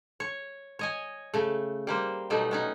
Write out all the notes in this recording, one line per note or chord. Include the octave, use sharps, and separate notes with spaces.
C#5
C#5 D#5 G#5
C#3 A3
G3 A#3 C5
B2 F#3 G3 A3 D#4
B3 C#4 D#4